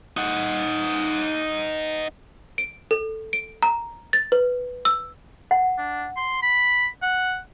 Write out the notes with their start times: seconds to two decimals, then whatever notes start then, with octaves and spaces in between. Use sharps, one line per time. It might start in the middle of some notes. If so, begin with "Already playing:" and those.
0.17 D#4 F#5
2.58 D7
2.91 A4
3.33 D7
3.63 A#5
4.13 A6
4.32 B4
4.85 E6
5.51 F#5
5.78 D4
6.17 C6
6.43 B5
7.02 F#5